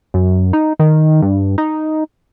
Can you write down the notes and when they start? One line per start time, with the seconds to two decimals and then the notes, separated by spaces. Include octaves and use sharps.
0.14 F#2
0.53 D#4
0.79 D#3
1.22 G2
1.58 D#4